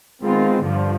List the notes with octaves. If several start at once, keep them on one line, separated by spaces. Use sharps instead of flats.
D#3 G#3 B3 C4 F4
G2 D3 F3